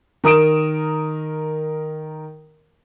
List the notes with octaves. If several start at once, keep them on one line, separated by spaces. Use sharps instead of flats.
D#3 A#4 D#6 D7 E7